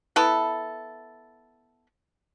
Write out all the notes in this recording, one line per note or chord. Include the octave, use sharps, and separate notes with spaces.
B3 E4 A4